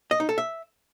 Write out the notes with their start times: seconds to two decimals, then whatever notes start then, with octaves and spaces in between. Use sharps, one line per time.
0.11 D#5
0.20 D#4
0.29 A4
0.38 E5